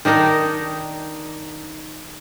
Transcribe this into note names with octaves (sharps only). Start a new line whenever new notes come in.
D#3 D4 D#4 A#4